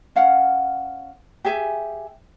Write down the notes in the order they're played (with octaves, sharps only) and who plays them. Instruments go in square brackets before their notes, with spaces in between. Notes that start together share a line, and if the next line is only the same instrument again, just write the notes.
[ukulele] C#4 F5 F#5
G4 G#4 E5 G#5